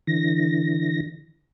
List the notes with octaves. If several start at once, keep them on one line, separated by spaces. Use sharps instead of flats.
D3 E3 A#6